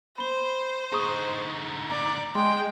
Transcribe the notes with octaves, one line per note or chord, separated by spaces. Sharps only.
C5 B5 G7
D3 D#4 G#4 C#6 D#6
D5 A#5
G#3 G5 C6